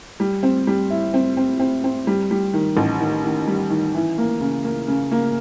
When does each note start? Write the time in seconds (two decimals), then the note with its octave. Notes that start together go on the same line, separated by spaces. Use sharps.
0.20 G3
0.43 C4
0.67 G3
0.90 E4
1.14 C4
1.37 C4
1.60 C4
1.84 C4
2.07 G3
2.31 G3
2.54 D#3
2.77 A1
3.00 D#3
3.25 D#3
3.47 G3
3.70 D#3
3.94 E3
4.18 A#3
4.41 C#3
4.65 A#3
4.88 C#3
5.11 A#3